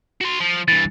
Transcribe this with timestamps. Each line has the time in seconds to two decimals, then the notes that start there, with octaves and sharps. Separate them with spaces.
0.21 F#4 C6
0.40 F3
0.68 G2 E3 A6